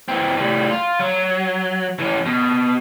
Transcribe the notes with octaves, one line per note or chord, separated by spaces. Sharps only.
E3 C4
A2 G3
F4
F#3
E3 C#4
B2